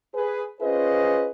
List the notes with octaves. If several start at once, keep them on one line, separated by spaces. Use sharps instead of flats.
G#4 B4
C#4 F4 G#4 B4 C5 D#5